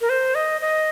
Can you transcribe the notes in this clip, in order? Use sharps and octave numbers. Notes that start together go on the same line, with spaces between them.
A#4
C5
D#5
D#5